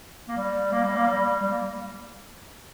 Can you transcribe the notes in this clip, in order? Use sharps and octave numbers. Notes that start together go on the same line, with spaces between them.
A#3
G3
A#3
G3
A#3
G3
G3
A#3